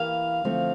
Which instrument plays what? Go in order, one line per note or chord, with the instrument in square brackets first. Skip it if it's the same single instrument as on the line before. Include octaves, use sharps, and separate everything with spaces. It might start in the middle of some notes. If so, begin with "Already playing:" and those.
Already playing: [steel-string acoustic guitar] E3 A#3 E4 G4 [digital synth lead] F5
[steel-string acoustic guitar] D3 F3 A3 C4